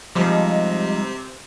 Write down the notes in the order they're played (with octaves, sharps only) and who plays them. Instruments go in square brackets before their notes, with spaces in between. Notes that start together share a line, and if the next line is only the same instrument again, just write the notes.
[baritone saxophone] C3 [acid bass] F3 [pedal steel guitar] G3 G#3 D#4 [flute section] D#5